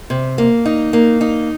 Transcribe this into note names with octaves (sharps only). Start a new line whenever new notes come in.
C3
A#3
D#4
A#3
D#4